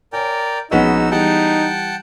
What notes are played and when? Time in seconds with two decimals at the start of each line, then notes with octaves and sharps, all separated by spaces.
0.13 A#4 C#5 D5 G5 G#5
0.71 A#1 G#3 B3 C#4 D#4 F#4 B5 E6
1.11 E3 G3 D#4 F#5 G5 A5 G7